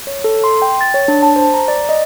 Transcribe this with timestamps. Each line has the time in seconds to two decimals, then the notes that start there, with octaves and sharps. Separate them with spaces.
0.07 C#5
0.24 A4
0.44 C6
0.62 G5
0.81 A6
0.94 C#5
1.08 D4
1.23 A5
1.36 C5
1.54 A#5
1.68 D5
1.89 D#5